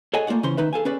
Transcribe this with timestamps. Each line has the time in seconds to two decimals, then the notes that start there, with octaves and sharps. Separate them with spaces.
0.13 G#4 A4 C#5 D#5 F#5 G#5
0.27 A3 A#3 F4 D5 F#5
0.43 C#3 E3 C#4 C5 C6
0.57 D#3 D#4 B4 E5
0.73 G#4 A4 F5 G#5
0.85 C#4 G#4 B4 D5